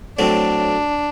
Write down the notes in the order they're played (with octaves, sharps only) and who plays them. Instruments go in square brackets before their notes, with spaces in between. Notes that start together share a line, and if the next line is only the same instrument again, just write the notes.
[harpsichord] A2 F#3 C4 [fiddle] D4